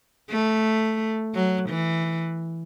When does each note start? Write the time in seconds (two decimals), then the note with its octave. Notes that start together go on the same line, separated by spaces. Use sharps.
0.31 A3
1.34 F#3
1.69 E3